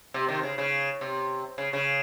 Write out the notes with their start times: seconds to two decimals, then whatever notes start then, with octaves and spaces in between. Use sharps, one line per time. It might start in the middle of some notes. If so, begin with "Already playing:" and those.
0.14 C3
0.28 C3 D#3
0.43 C#3
0.58 C#3
1.01 C3
1.58 C#3
1.73 C#3